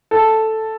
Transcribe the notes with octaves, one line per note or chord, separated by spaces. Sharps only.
A4